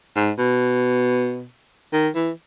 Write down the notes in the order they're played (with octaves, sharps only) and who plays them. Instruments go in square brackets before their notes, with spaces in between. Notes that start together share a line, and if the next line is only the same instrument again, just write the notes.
[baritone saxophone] G#2
B2
D#3
E3